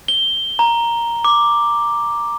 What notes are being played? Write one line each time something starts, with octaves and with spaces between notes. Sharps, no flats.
G7
A#5
D6